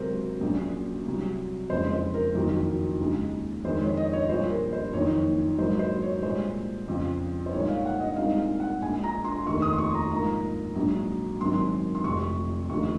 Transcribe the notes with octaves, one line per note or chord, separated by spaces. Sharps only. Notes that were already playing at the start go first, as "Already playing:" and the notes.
Already playing: C#2 C3 F#3 A#4 C5
A#1 A#2 F#3 C#4
C2 C3 F#3
F#1 F2 C#3 G#3 C5
C5
A#4
F#1 F2 D#3 F#3 A#4
D#2 C#3 G#3
F2 D#3 G#3 C5
C#5
D#5
C#5
C2 A#2 F3 C5
A#4
C5
F#1 F2 D#3 A#3 D#4 C#5
G#2 F#3 A#3 D#4 C5
C5
C#5
C2 A#2 G#3 C5
F2 C#3 F3 C4
C5
C2 A#2 G#3 D#4 C#5
F5
F#5
D#5
C2 A#2 G#3 C4 D#4 F5
F5
F#5
A#1 A#2 G#3 G#5
A#5
C6
F1 D#2 D#3 C#6
D#6
C6
C#6
A#5
G#2 F3 A#3 A#5
A#1 G#2 F#3
G#1 F#2 D#3 F#3 C4 C6
C6
F1 F2 C3 F3 C#6
F1 D#2 C#3 F3 C#6